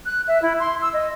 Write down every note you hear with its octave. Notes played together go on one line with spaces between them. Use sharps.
F#6
E5
E4
C6
E6
D#5